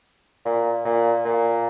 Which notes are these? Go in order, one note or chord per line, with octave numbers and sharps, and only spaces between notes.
A#2
A#2
A#2